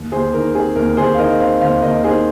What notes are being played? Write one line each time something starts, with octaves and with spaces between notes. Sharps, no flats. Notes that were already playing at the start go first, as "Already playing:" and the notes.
Already playing: D#2
D#2 G#4 C5
D#3 A#4
C4 G#4
D#2 A#4
D#2 G#4 C5
F5
D#3 A#4 D#5
C4 C5 F5
D#2 C5 F5
D#2 A#4 D#5
D#3 G#4 C5